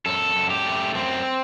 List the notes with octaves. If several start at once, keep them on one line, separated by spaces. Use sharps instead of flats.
F#2 A4
F#2
G4
A3
F#2 C4